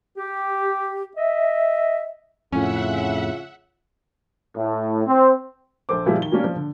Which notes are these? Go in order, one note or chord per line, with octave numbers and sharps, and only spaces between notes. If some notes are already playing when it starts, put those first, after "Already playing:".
G4
D#5 E5
F2 A2 C#3 C#4 F4 E5 F#5
A2
C4
A#1 A4 C5 D6
A#2 F3 G3 G#3 E4 G#4
D#3 G7
F#3 G3 A#3 C#4 D4
F3
D3